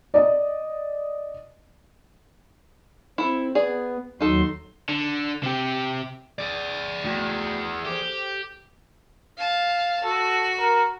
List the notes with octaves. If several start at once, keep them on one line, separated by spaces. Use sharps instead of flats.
D5 D#5
C4 E4 A4
B3 G#4 D5
D#2 F#3 D#4 A4 C6
D3
C3 G4
G#4 D5
E2 A3 F#4 G5
G4 A4 C5
F5 A5
F#4 A4
A#4